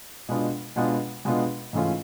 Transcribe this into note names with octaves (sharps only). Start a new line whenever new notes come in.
B2 G#3 B3 D4 F4
B2 G#3 B3 D4 F4
B2 G#3 B3 D4 F4
G#2 E3 A3 C#4 F4